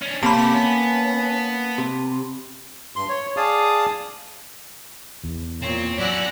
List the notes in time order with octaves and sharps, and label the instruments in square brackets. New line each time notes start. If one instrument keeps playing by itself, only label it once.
[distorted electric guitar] C#4 D4
[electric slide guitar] C3 [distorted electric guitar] A3 G4 [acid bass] A#3 [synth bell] A5 B5
[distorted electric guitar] B3 [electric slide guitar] C#4
[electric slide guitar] C3
[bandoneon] G2 C6
C#5
G#4 D5 F5 A5 D#6
[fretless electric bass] E2
[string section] A#2 [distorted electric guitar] C4 [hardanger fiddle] C#5
[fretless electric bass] F#3 [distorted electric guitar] C#4 E4 [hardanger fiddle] D5 F#5 [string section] E6 F#6 A#6